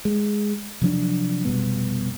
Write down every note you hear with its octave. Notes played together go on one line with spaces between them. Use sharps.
G#3
C3 F3 F#3 D4
F1 B2 G3 B3